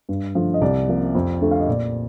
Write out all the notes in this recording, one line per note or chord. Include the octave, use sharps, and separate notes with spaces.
G2
D3 F3 A3
D#5
C2 D5
C3 F3 A#3
F2
D3 A3
F5
D#5
A#2 D5